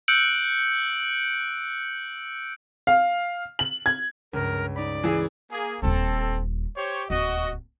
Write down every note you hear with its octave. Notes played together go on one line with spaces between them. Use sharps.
E6 F#6 G6 C#7 D7 F#7
F5
F#7
G#6
C#2 G2 A#4
D#4 D5 B5
E3 G#4
A#3 G#4
D#1 D#2 C4 A4
G4 C5 C#5
D1 D#2 F#4 D#5